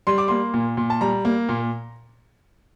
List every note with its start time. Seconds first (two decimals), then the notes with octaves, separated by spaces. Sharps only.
0.07 G3 C6
0.18 D6
0.28 A#3 C6
0.54 A#2
0.77 A#2
0.90 A5
1.01 G3 A#5
1.25 A#3
1.49 A#2